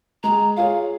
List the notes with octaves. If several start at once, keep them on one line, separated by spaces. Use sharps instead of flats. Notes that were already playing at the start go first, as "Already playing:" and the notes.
G#3 A#5
F4 G#4 C#5 F5